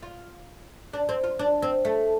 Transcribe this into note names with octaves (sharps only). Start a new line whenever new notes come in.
F4
D4
C4
F4
D4
C4
A3